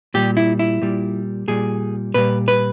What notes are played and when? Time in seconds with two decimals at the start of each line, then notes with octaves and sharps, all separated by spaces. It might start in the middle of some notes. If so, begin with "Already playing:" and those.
0.14 A#2 G3 G4
0.37 E4
0.59 E4
0.82 A#2 G3
1.48 A#2 G3 G#4
2.14 A#2 G3 B4
2.48 B4